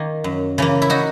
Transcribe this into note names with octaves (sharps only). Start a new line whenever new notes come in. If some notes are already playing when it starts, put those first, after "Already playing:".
Already playing: D#3 A#3
F#2
C#3 E3 A#3
E4
D#4 F#4